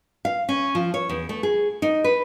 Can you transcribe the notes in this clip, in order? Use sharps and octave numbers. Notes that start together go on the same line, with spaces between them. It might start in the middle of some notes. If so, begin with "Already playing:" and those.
F5
C#4
F3
C#5
E2
A3
G#4
D#4
B4